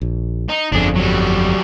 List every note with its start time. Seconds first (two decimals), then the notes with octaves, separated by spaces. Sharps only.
0.02 A#1
0.49 D#4
0.72 G1 F2 D4 G#4
0.95 F#3 G3